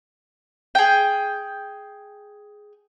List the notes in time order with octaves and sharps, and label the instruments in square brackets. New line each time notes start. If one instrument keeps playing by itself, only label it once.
[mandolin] G#4 G5